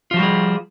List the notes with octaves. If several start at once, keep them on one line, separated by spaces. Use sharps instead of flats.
F3 G3 F4 F#4 G#4